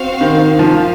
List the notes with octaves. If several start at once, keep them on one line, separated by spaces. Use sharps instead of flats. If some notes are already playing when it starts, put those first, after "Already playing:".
Already playing: C4 F#4 C5 F5
D#3
F3 A#3 F4 A#4 F5